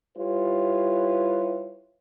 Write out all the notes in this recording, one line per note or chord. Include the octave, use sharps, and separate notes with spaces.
G3 E4 F4 G4 B4 C#5